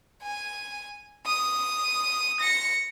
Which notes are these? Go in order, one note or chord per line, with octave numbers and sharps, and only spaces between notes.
G#5
D#6
A#6 C#7